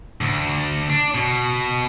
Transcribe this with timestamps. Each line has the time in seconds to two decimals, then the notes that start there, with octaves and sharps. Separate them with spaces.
0.21 D2
0.90 D4
1.15 B2